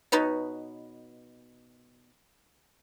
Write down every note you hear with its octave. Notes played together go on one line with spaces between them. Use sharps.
B2 D#4 B4 C#5